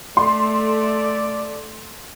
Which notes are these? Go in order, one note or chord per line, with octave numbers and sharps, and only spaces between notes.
A3 D5 C6